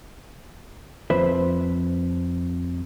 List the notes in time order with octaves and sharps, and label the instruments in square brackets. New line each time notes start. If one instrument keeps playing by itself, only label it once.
[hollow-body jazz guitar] F2 B4 C5 E5